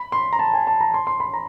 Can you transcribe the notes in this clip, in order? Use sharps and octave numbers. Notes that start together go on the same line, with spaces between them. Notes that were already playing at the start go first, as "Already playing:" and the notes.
Already playing: B5
C6
A#5
A5
G#5
A5
A#5
C6
C6
B5
A#5